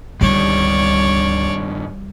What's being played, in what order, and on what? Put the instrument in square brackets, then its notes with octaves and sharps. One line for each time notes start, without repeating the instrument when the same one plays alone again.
[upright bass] C#2 D3 [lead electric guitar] G2 D#3 [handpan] G3 [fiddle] C#5 D5